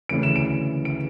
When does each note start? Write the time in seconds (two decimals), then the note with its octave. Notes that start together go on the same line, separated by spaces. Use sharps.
0.09 D2 C#3 E3 D7
0.23 E7
0.36 D7
0.85 D7